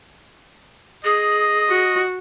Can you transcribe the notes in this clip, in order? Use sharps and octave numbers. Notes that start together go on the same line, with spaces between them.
G#4 D#5
F#4